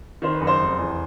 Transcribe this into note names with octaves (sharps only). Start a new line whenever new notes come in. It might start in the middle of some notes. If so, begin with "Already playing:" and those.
D#3 C5
B4
F#1
C5
F1
E2